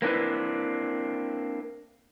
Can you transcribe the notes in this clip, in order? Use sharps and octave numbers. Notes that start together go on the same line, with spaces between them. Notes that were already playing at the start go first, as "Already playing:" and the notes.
A#3 C4 D4 E4 B4